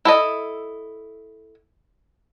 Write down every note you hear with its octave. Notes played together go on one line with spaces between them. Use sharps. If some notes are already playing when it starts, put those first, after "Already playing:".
E4 A4 D#5